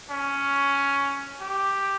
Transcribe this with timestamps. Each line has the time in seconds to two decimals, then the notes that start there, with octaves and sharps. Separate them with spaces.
0.10 C#4
1.40 G4